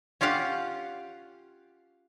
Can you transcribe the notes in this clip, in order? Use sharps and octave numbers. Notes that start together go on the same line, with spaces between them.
C#4 F4 G4 F5 F#5